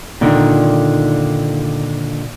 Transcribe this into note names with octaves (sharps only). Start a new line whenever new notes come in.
A#2 D3 D#3